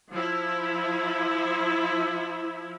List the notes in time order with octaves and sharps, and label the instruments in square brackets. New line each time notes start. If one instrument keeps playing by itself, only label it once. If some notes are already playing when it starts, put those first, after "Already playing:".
[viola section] F3 E4